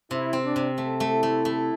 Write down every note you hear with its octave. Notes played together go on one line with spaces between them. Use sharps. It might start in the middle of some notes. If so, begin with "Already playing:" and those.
C3 E4
C4
D4
C3
A3
A3
E4
A3
A3